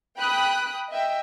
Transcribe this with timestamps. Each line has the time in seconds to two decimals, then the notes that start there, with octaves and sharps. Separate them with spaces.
0.17 G5 B5 D#6 F#6
0.89 D#5 E5 G5